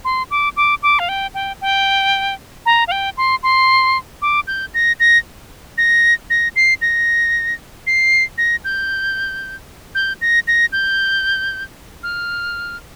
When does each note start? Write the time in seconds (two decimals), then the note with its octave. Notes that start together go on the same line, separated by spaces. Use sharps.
0.05 C6
0.31 D6
0.57 D6
0.83 D6
0.99 F5
1.09 G5
1.34 G5
1.61 G5
2.66 A#5
2.87 F5
2.91 G5
3.17 C6
3.43 C6
4.22 D6
4.47 G6
4.74 A#6
5.00 A#6
5.78 A#6
6.30 A#6
6.56 C7
6.81 A#6
7.87 C7
8.38 A#6
8.65 G6
9.95 G6
10.21 A#6
10.47 A#6
10.72 G6
12.03 F6